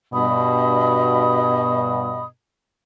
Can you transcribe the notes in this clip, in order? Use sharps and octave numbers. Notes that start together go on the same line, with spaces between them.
G2 B2 D#5 B5 D#6